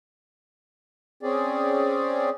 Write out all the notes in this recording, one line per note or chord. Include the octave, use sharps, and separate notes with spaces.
C4 C#4 G#4 D5